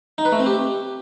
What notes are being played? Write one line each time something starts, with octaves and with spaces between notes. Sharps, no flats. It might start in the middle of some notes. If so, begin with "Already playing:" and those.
D#4
B4
A3
C4
G4